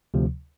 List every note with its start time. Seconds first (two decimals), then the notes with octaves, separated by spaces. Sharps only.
0.14 D2 C3 F3